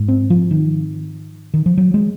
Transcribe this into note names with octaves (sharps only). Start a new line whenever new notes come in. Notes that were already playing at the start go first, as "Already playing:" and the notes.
Already playing: G#2
C4
F3
D#3
D#3
F3
F#3
G#3